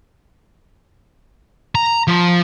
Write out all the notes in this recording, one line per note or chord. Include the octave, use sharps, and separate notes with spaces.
A#5
F3